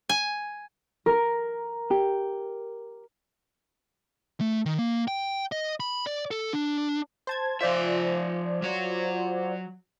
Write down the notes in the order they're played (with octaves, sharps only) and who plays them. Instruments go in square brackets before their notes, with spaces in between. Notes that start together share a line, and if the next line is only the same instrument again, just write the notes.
[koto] G#5
[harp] A#4
[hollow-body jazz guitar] G4
[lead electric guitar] A3
D#3
A#3
G5
D#5
B5
D5
A4
D4
[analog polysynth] C5 A5 G#6
[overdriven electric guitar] F3 E5 [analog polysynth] F4 C5 D5
[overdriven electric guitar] F#3 C#5